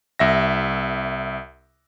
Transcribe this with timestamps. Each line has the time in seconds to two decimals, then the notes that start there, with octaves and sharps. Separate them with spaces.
0.19 C2 E5 A#6